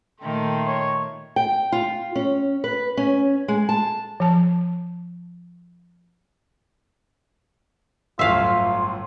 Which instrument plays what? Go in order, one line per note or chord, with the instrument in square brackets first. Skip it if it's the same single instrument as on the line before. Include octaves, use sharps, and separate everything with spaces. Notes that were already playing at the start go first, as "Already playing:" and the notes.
[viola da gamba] A#2 D#3 A3 [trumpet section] G5 C6
[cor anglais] C#5
[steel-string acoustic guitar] G5
F4
C#4
B4
C#4
G#3
A5
[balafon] F3 A5
[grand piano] G1 F#2 A2 [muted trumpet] F4 [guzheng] E5 F5 [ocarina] C6